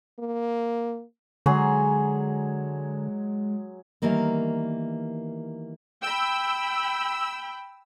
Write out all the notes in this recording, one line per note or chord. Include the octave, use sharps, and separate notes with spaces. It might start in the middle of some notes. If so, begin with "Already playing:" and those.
A#3
D3 F#3 G#3 G#4 C6
D#3 E3 G3 A#3 B3
G5 B5 E6